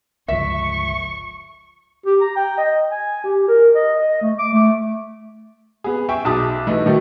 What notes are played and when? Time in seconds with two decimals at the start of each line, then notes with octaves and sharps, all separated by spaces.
0.28 G1 C#2 F3 E5 C#6
2.06 G4
2.21 A#5
2.36 G5
2.57 D#5
2.91 G#5
3.24 G4
3.48 A#4
3.75 D#5
4.00 D#5
4.21 A3
4.39 D6
4.53 A3
5.84 B3 G#4
6.09 E5 G5 G#5 C#6
6.25 B1 G#4 E5 A5 D6 D#6
6.67 E3 A3 D#4
6.86 D#3 F#3 A3